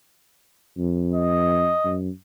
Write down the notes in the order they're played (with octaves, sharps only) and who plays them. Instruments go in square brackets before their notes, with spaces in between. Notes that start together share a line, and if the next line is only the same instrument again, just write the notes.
[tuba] F2
[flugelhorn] D#5
[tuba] F#2